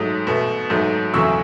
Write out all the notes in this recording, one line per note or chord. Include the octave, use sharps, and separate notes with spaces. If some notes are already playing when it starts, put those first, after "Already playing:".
Already playing: G#2 F#3 A3 D#6
B2 A3
G#2 F#3 A3
E2 C#3 F#3 A3 C#6 E6